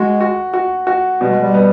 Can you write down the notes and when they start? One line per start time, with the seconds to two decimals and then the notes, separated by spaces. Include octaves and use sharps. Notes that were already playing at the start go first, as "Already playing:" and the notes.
Already playing: G#3 F#4
0.20 F#4
0.54 F#4
0.87 F#4
1.21 B2 G3
1.30 G#3
1.41 G3
1.54 B3